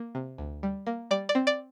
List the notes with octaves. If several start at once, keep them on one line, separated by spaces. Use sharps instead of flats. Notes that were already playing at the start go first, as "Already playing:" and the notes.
Already playing: A#3
C3
D2
G3
A#3
G3 D5
D5
C4
D5